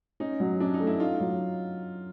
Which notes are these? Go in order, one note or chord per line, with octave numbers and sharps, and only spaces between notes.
C#4 D#4
F#3
C#4 D4
D#4
A3
E4
D#4 F4
F#3